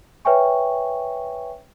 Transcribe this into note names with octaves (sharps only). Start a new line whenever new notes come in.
B4 C#5 E5 G5 G#5 C#6